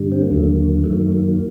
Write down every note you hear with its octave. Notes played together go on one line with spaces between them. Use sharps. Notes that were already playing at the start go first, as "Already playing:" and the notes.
Already playing: G2 D3 G3
C4
A#3
D#2 D3 F#3 A3
A#3
F#2 D#3 F#3 A3
A#3
A3
A#3